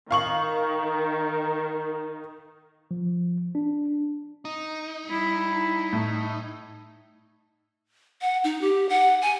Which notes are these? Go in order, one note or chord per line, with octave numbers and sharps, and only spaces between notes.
D#3 F5 C#6 F#7
F3
D4
D#4
G3 E4
A2
F#5
D#4
G4
F#5
G#5